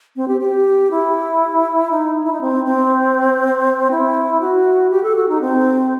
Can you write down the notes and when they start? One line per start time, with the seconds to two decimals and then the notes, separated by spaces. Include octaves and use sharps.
0.16 C4
0.28 G4
0.41 G4
0.91 E4
1.91 D#4
2.24 E4
2.32 D#4
2.41 C4
2.65 C4
3.91 E4
4.41 F#4
4.90 G4
5.03 A4
5.16 F#4
5.29 D#4
5.41 C4